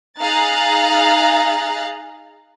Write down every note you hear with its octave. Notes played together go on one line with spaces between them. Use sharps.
D#4 G#4 F5 A#5 F#6 A6